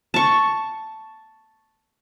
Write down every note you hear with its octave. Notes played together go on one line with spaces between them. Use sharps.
A5 C#6